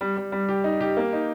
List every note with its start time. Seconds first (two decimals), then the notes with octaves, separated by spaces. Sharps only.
0.01 G3
0.17 G3
0.32 G3
0.49 G4
0.64 D#4
0.81 G4
0.97 A#3
1.13 D#4